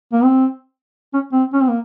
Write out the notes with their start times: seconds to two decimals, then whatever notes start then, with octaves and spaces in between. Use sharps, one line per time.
0.12 A#3
0.24 C4
1.14 C#4
1.33 C4
1.53 C#4
1.61 C4
1.68 A#3